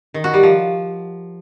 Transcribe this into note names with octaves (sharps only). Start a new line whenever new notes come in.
D#3
F#4
G3
F3